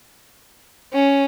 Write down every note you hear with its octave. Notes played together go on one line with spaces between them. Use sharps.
C#4